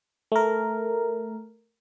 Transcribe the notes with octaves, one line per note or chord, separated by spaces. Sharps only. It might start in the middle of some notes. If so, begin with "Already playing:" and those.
A3 A#4